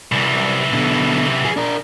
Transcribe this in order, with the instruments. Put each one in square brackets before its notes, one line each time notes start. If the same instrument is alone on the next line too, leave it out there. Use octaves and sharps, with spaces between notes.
[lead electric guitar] C2 [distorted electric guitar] F#2 E3
[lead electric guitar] B2 D3
C3
G#4
D4 A#4